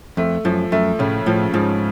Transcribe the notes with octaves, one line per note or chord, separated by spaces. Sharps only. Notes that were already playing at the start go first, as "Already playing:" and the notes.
F2 A3
F#2 F3
F#2 A3
A2 C#3
A2 F3
G#2 F3